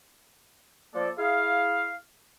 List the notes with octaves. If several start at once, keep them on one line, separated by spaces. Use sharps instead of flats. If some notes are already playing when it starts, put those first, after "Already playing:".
F3 A#3 A4 D5
E4 G#4 F5